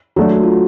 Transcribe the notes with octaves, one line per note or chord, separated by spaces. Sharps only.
F#3 A3 D4 F#4
F#4
F4